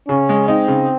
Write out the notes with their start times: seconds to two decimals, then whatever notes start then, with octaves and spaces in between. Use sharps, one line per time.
0.08 C#3 C#4
0.29 G#3
0.48 C4 D#4
0.68 C#3